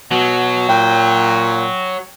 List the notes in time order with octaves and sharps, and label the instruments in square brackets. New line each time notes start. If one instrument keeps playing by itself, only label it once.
[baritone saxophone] B2 [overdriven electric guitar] F#3
[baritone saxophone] A#2 [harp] G5